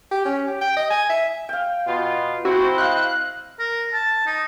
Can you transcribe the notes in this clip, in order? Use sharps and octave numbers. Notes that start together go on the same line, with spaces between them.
G4
C#4
G4
G5
D#5
G#5
E5
F5 G5
B2 F4
C4 E4 F#4 C5
D#5 F5 F#6
A#4
A5
D#4